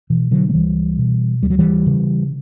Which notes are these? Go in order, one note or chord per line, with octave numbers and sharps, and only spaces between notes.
B2 E3
D3 F#3
A3
C#2 E3 G3
B2
D2 G3
F#3
E3 G3
C#3